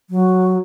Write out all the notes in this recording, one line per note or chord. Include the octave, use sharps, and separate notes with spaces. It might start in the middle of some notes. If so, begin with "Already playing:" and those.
F#3